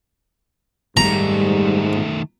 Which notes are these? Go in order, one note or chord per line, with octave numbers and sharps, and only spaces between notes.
G#2 D#3 G3 A3 A#5